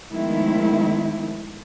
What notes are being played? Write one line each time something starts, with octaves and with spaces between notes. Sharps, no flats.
D#3 F3 G#3 A3 B3 E4